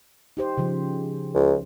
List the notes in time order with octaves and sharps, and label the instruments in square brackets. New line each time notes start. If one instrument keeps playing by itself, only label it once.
[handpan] D#4 G4 C5
C#3 F3
[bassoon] C#2